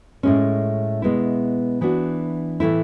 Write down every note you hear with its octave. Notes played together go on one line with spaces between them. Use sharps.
A2 G#3 C#4
B2 G#3 B3 E4
E3 B3 D4 F#4
A2 E3 A3 E4